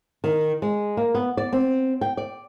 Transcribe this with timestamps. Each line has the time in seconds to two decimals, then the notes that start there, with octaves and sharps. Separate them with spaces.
0.24 D#3
0.62 G#3
0.97 A#3
1.15 B3
1.37 D5
1.53 C4
2.01 G5
2.17 D5